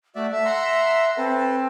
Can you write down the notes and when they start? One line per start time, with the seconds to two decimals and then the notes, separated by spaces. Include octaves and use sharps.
0.15 A3 F#4 D5 E5
0.31 A3 E5
0.45 F#5 A#5 C6
1.17 C4 A4 B4